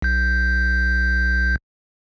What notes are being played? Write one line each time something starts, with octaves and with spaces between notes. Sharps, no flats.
B1 G6